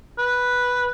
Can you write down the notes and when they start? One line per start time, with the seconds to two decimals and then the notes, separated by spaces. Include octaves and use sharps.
0.18 B4